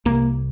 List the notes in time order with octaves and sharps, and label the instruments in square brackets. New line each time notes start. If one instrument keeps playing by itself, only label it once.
[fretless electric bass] C2 C3 A#3